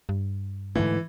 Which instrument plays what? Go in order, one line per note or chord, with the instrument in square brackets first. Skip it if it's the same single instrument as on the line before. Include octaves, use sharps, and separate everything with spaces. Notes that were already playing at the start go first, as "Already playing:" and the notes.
[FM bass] G2
[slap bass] G#2 D3 A3 [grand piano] E3